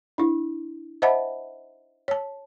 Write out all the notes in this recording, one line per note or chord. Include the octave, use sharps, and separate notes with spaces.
D4 E4
C5 D#5 E5 F#5 A5 B5
C#5 A5